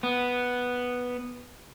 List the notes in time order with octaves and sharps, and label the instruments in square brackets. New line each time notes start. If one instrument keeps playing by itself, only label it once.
[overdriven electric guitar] B3